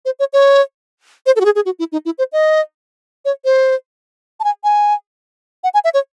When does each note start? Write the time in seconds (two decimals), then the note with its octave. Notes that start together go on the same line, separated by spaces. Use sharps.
0.05 C5
0.19 C#5
0.33 C#5
1.26 C5
1.36 A4
1.40 F#4
1.45 G#4
1.55 G#4
1.65 F#4
1.79 E4
1.92 D#4
2.05 E4
2.18 C5
2.32 D#5
3.25 C#5
3.45 C5
4.40 A5
4.44 G#5
4.64 G#5
5.64 F#5
5.74 G#5
5.84 E5
5.94 C#5